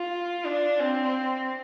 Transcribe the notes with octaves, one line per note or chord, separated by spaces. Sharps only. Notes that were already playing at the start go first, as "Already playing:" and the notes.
Already playing: F4
D4
C4